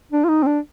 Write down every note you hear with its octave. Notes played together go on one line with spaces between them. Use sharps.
D4
F4
D#4
C4
D4